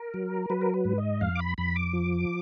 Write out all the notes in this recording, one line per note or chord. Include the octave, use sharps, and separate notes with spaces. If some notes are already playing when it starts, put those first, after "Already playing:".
Already playing: A#4
F#3
F#3 B4
A#4
B4
G#2
D#5
F2 F5
D6
B5
F2 B5
D6
F3